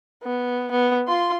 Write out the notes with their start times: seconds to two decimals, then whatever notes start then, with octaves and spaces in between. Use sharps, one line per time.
0.23 B3
0.71 B3
1.08 F4 C6